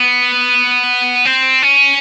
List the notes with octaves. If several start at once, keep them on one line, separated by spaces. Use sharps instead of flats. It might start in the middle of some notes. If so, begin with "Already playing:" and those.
Already playing: B3
C4
C#4